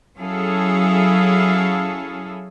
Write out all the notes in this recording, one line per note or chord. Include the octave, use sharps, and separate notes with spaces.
F#3 C#4 E4 G#4 A4 F5